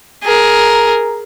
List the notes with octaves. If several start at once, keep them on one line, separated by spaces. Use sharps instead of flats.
G#4 A#4